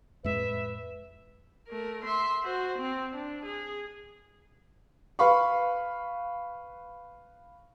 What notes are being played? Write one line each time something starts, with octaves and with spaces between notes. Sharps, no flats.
F2 A2 G#3 B4 E5
A3 A#4
E5 C6
F#4 C5
C4
D4
G#4
B4 F5 B5 C#6